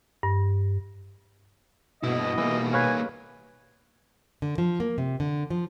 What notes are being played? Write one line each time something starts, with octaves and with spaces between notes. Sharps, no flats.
G2
G2 B2 E4 D#5
E3 G3 A#3
B4 C#5 F5 G#5
D3
F3
A#3
C3
D3
F3